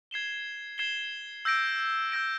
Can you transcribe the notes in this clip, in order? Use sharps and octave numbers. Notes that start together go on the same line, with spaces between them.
G#6 C7 E7 G7
G#6 C7 E7 G7
E6 G6 A#6 D7
E6 G6 A#6 D7